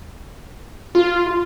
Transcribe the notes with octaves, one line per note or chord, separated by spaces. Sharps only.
F4